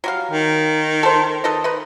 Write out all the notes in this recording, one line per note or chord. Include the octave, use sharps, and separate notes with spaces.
F#3 G3 F5
D#3
A4 C5
A4 B4 D#5
D#4 B4